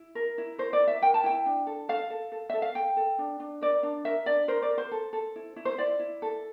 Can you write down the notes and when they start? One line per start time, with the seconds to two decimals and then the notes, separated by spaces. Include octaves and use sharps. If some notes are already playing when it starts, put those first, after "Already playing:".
Already playing: E4
0.15 A#4
0.38 E4
0.58 A#4 C5
0.73 D5
0.80 E4
0.88 E5
1.02 A#4 G5
1.14 A5
1.24 E4 G5
1.46 D4
1.67 A4
1.89 A4 F5
2.10 A4
2.32 A4
2.50 A4 E5
2.62 F5
2.75 A4 G5
2.97 A4
3.18 D4
3.40 D4
3.61 A#4 D5
3.83 D4
4.05 A#4 E5
4.26 D4 D5
4.48 A#4 C5
4.62 D5
4.70 A#4
4.78 C5
4.92 A4
5.13 A4
5.36 E4
5.56 E4
5.65 C5
5.78 E4 D5
5.99 E4
6.22 A4